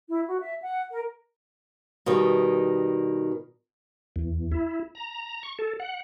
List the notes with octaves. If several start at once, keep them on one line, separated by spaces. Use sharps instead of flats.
E4
F#4
E5
F#5
A#4
B2 D#3 G3
E2
E4
A#5
C#6
A4
F#5